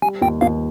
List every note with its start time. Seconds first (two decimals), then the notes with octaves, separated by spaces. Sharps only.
0.02 G3 G#5
0.21 D#2 G5
0.41 D#2 F5